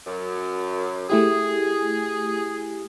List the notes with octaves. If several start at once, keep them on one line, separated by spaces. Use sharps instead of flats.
F#2
A3 E4 G4 G#4